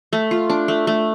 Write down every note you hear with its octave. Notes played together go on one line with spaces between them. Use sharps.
A3
F4
D4
A3
A3